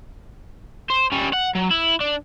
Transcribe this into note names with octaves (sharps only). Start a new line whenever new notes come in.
C5
G3 C#4
F#5
F#3
E4
D4